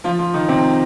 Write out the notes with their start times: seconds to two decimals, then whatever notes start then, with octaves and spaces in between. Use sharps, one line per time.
0.04 F3 F4
0.19 F3 F4
0.34 D#3 D#4
0.48 C3 C4